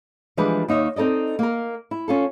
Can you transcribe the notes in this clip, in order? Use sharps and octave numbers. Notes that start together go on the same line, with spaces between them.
E3 F3 G3 G#3 D4 B4
D#2 D#4 C#5 E5
C4 D#4 A4 D5 D#5
A#3 A#4
E4
C#4 F4 A4